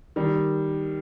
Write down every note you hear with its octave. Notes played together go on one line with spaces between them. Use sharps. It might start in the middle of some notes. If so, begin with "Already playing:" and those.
D#3 G3